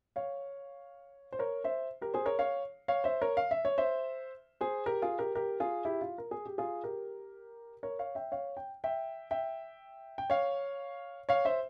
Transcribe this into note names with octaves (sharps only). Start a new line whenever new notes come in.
C#5 F5
C5
A#4 C#5
C5 E5
G4 A#4
G#4 C5
A#4 C#5
C#5 F5
C#5 F5
C5 E5
A#4 C#5
F5
E5
C#5
C5 E5
G#4 C5
G4 A#4
F4 G#4
G4 A#4
G4 A#4
F4 G#4
E4 G4
F4
A#4
G#4
G4
F4 G#4
G4 A#4
A#4 C#5
C#5 F5
E5 G5
C#5 F5
G5
E5 G5
E5 G5
G5
C#5 F5
C#5 F5
C5 E5